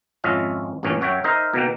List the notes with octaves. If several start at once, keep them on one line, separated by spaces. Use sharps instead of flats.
G#1 F2 C#4 F4 D#5 E5
A1 G2 A#2 C#4
F#2 F#4 C#5 E5 G5
D#4 A#4 C5 D#5 E5
B2 D#3 A#3 G5